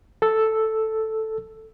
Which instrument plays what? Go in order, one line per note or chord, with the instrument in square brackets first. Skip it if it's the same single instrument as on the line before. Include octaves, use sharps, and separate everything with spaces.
[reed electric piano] A4 E6